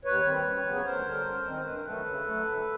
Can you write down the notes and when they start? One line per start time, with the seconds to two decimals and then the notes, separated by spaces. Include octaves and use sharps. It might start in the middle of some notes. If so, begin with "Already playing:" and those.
0.05 D#2 B4 C#5
0.25 D#3 G3 C4
0.46 F#2
0.65 C#3 F#3 B3
0.74 C#5
0.85 D2 A#4 C5
1.05 D3 G3
1.26 F#2
1.45 D#3 G#3 C4
1.65 G2 B4
1.75 A#4
1.85 D#3 F#3 A3 A4 B4
2.05 C#3
2.25 F#3 A3
2.45 D2